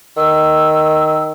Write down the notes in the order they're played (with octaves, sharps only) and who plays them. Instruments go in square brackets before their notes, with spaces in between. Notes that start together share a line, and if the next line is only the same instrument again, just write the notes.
[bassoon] D#3 [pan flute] E6